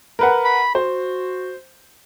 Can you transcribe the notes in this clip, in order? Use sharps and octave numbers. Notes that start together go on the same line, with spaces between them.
A#4 B4 F#5
B5
F#4 C5